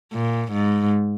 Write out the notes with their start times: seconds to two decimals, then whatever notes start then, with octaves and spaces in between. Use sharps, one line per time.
0.13 A#2
0.52 G#2